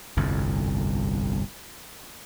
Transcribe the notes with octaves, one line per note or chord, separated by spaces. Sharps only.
G1 C2 F2